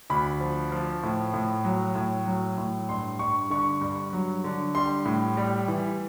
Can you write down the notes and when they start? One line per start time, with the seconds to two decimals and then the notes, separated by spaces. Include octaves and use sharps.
0.10 D2 B5
0.40 F3
0.72 F3
1.03 A2
1.34 A2
1.65 F#3
1.95 A2
2.27 F#3
2.58 A2
2.89 G2 C6
3.19 G2 C#6
3.50 D3 C#6
3.81 G2
4.13 F#3
4.44 D3
4.75 G3 C6
5.05 A2
5.37 G3
5.68 E3